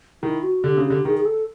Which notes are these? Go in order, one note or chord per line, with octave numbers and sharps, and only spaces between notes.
D#3 E4
F#4
D3 G4
C#3
G4
D3
D#3 G#4
G#4
A4